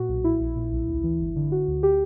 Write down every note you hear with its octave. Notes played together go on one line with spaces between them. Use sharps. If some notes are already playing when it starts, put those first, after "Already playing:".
Already playing: A#2 F#4
B1
A#2 E4
A#1
A#2
B1
D2
E3
G1
D3
D3 F#4
D2
G4